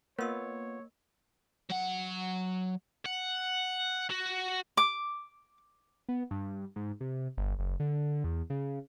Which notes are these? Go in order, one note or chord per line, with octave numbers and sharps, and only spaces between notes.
A#3 B3 F4 A#4 C#5 E6
F#3 F#5
F#5
F#4
D6
B3
G2
G#2
C3
G1
F#1
D3
E2
C#3